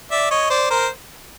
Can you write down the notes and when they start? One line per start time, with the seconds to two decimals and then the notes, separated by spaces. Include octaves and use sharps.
0.11 D5 E5
0.31 C#5 D#5
0.50 C5 D5
0.70 A#4 C5